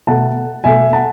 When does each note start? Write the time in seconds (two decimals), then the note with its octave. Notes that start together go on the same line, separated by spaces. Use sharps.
0.07 B2 A3 F#5 A5
0.64 B2 A3 E5 G#5
0.93 F#5 A5